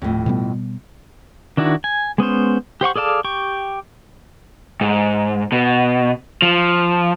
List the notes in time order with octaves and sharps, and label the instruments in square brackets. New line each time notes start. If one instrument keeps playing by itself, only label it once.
[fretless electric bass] D#1 [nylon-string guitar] F2 A2
[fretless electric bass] B2 G3 B3
[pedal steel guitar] D#3 D4 E4 F#4
G#5
G#3 B3 C#4 C5
G4 C5 F#5 C#6
G#4 A4 D5 F5 A5
G4 G5 C#6
[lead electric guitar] G#2
B2
F3